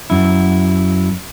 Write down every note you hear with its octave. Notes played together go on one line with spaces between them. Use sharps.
F#2 E4